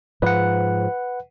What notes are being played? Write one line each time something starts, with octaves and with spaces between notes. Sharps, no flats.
G#2 F3 B4 F#5